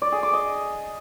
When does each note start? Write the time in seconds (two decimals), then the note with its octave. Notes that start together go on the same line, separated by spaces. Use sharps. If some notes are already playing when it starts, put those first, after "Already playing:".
0.02 D5
0.12 G#4
0.23 D6
0.33 D#5